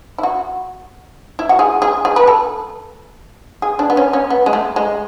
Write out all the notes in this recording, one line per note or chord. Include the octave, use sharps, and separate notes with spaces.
E4
F#4
E4
F#4
G#4
G#4
G#4
B4
A4
G#4
D4
B3
C#4
C#4
B3
G#3
A3
G#3